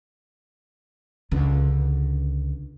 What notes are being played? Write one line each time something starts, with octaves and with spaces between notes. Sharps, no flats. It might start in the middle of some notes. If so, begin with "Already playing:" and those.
C#2 D3